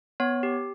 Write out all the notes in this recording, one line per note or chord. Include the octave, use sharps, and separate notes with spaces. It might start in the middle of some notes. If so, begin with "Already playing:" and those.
B3 C#5
G4